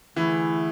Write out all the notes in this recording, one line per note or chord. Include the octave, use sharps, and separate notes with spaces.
D3 E3 A3 E4 G#4